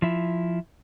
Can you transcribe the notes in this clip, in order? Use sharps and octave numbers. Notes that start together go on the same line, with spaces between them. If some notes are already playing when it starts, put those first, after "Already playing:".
F3 E4